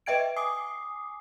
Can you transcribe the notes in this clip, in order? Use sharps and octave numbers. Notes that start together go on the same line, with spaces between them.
B4 D#5 E5 G5 G#6 D7
G#5 D6 D#6 C7